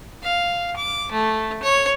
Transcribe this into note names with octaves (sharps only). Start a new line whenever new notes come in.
F5
D6
A3
C#5